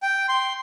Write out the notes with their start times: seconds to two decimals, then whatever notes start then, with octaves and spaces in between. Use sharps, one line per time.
0.02 G5
0.28 C6